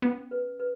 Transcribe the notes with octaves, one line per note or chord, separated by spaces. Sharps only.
B3 C#4
B4
B4